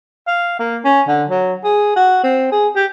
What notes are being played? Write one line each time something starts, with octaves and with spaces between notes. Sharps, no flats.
F5
A#3
C#4
D3
F#3
G#4
F#4
C4
G#4
G4